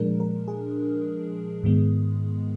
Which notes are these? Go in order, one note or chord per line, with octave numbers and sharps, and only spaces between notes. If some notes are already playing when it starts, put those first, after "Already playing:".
Already playing: A#2 F3 G#3 D4 A#4
A#4
G#4
G#2 D#3 G#3 B3